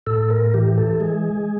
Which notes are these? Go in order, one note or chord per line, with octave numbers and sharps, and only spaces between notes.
A2 A4
A#4
E3 G4
A4
G#3 G#4